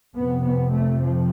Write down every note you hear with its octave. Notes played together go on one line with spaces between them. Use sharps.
F2 C3 B3
B3
A3
F3